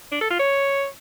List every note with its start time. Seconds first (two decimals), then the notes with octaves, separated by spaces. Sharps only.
0.12 D4
0.21 A4
0.30 F4
0.40 C#5